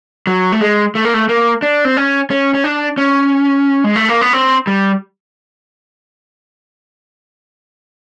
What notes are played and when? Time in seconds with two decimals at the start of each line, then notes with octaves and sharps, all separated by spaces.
0.27 F#3
0.52 A3
0.61 G#3
0.95 A3
1.05 A#3
1.14 A3
1.29 A#3
1.62 D4
1.85 C4
1.97 C#4
2.31 C#4
2.54 C#4
2.64 D4
2.98 C#4
3.84 G#3
3.96 A3
4.09 A#3
4.21 B3
4.33 C4
4.67 G3